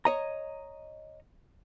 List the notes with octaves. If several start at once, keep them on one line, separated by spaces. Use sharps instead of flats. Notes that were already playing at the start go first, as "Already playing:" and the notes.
C#5 D#5 A#5